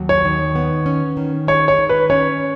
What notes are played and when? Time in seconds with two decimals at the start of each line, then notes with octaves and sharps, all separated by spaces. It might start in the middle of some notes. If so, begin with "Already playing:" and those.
Already playing: D#2 F#3
0.09 C#5
0.25 D#3
0.55 B3
0.86 C#4
1.17 D#3
1.47 G#3 C#5
1.68 C#5
1.79 D#3
1.89 B4
2.10 C#4 C#5